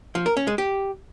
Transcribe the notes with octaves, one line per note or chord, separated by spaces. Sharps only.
F3
A#4
C#4
G#3
G4